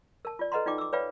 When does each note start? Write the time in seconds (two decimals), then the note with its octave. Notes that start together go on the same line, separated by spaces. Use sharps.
0.25 A#4 A5
0.39 F4 D5
0.52 A4 B4 D#5 F#5 A#5 C6
0.66 D#4 F4 D5 G5 D6
0.78 D6 E6
0.93 B4 C#5 D5 F5 G5 B5